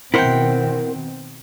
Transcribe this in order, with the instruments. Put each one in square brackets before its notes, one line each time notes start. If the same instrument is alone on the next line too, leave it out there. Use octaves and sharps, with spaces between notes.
[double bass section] B2 D#3 C4 [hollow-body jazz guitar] E4 A#4 C5 [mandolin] F#5 G5